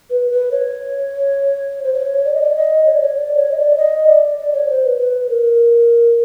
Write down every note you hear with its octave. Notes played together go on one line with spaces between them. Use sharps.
B4
B4
C#5
C5
C#5
D5
D#5
D5
D#5
C#5
D5
C#5
D5
C#5
D#5
D5
D#5
D5
D5
C#5
C5
B4
B4
A#4